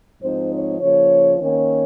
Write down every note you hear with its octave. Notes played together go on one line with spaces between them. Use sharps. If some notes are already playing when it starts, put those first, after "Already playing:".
G#2 F3 C4 D#4 C5
C#5
C#3 F3 A#3 C#5
D#3 A#3 C#4 C#5